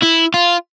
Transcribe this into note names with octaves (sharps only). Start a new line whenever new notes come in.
E4
F4